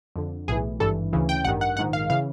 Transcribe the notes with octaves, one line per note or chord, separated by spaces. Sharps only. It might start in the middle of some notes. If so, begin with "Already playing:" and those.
F2 D3
B1 A2 E3 G#4
G#1 G2 E3 A4
D2 C#3 E3
G5
A1 G2 D#3 F#5
F#5
A#1 G#2 D#3 F#5
F5
C#3 E3 F5